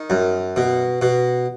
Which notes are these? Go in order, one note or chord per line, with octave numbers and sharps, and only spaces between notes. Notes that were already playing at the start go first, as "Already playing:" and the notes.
Already playing: D#3
F#2
B2
B2